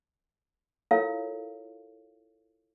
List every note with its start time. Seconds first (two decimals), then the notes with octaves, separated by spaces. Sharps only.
0.91 E4 F4 A4 A#4 C#5 F5